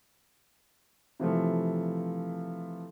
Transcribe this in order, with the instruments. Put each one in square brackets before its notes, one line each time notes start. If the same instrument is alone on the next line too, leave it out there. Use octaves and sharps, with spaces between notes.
[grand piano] C3 E3 F3 A3